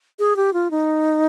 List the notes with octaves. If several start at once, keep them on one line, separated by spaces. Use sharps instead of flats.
G#4
G4
F4
D#4